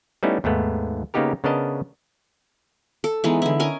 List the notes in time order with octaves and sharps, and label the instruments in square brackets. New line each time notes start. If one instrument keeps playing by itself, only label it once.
[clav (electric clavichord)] G3 A3 B3 C#4 D#4 E4
D#2 G#2 A3 B3
C#3 A#3 B3 D#4 G4 A#4
C#3 B3 D4 A#4 D#5 A5
[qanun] A4
E3 G#3 B3 D#4
D3 E4
C#4 A#4 D#5 G#5